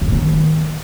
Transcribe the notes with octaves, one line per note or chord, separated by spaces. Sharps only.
A2
D3
D#3